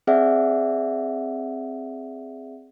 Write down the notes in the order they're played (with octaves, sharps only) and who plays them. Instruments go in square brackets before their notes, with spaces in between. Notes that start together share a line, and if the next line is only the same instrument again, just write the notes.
[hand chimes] C4 G#4 D5 E5 F#5